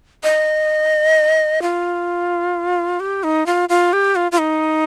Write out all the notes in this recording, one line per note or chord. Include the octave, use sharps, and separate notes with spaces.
D#5
F4
G4
D#4
F4
F4
G4
F4
F4
D#4